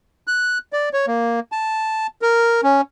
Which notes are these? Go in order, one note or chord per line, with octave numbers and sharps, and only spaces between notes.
F#6
D5
C#5
A#3
A5
A#4
C#4